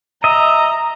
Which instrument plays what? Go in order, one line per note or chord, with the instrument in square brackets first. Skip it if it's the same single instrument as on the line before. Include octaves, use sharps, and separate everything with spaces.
[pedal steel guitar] D#5 E5 [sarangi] A#5